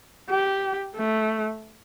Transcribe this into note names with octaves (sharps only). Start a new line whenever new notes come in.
G4
A3